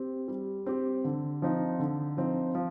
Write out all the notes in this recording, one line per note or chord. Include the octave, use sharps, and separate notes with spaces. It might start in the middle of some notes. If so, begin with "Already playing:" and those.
Already playing: C4 G4
G3
C4 G4
D3
F3 C4 D#4
D3
F3 C4 D#4
F3